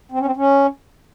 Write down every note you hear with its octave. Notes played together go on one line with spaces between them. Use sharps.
C4
C#4
C4
C#4